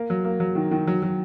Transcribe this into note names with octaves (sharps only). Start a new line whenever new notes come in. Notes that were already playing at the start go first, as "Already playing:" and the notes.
Already playing: A#3
F#3
A#3
F#3
D#3
D#3
F#3
F#3